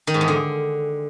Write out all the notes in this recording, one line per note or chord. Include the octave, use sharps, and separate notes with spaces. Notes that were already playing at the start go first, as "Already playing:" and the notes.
D#3
G#2
E2
D3